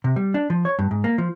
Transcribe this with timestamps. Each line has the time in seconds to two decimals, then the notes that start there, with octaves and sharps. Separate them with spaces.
0.04 C3
0.16 G3
0.34 D4
0.50 F3
0.65 C#5
0.79 G2
0.91 G#2
1.04 A#3
1.18 F3